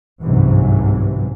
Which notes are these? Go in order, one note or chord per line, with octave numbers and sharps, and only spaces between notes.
G1 C2 G#2 C3 E3 F#3